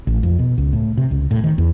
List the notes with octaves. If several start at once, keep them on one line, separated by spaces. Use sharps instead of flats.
A1
F2
B2
C#2
A2
C3
C#2
A2
D#3
E2